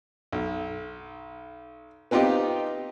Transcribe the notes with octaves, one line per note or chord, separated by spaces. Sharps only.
B1
B3 C4 D#4 F4 G4